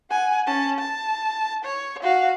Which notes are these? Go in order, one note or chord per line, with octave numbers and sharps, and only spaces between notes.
F#5 G#5
C#4 A5
A5
C#5
F#4 F5